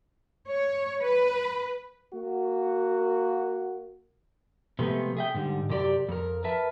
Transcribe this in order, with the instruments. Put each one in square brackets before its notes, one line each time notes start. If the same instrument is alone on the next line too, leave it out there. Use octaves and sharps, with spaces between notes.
[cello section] C#5
B4
[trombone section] A#3 F#4
[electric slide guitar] C3 F3 G#3 A3 B3 C4
G#4 E5 G5
G#2 D3 G3
F#2 C3 G4 D5
F2 A#4
A#4 B4 E5 A5